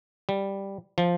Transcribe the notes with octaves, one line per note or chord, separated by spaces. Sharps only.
G3
F3